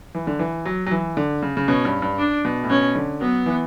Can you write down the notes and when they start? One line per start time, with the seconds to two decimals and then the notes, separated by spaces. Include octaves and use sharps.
0.15 E3
0.27 D3
0.39 E3
0.66 F#3
0.86 F#3
0.91 E3
1.17 D3
1.42 C#3
1.57 C#3
1.68 B2 C#4
1.85 G2
2.02 G2
2.19 D4
2.45 B2
2.63 A2
2.70 B2 C#4
2.96 D3
3.21 F#3 B3
3.46 E3